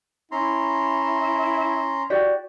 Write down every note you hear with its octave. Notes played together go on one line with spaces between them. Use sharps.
C#4 E4 A#5 C6
F#4 G4 D5